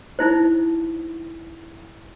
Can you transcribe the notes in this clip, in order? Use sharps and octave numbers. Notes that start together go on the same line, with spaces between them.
D#4 E4 C5